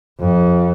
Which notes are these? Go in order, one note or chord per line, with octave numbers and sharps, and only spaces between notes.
F2